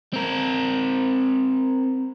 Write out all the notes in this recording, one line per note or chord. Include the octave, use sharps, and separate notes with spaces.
C4 A#4